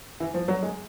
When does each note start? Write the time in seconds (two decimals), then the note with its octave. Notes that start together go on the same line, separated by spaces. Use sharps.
0.20 E3
0.34 F3
0.48 F#3
0.63 G#3